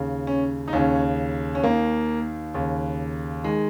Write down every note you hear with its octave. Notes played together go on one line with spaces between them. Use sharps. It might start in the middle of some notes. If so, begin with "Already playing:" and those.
Already playing: D#2 C#3
C#4
D#4
D#2 C#3 C#4
C#4
D#2 D#3 A#3
D#2 C#3
D#3 G#3